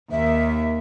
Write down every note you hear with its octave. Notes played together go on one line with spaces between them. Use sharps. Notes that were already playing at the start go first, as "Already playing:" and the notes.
D#2 E5